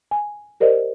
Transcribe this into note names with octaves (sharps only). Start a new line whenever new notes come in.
G#5
G4 A#4 C5 D5 D#5